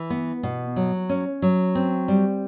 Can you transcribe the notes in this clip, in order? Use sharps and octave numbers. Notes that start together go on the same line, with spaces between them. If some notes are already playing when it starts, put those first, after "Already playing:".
Already playing: E3
B3
B2
F#3
C#4
F#3
C4
G3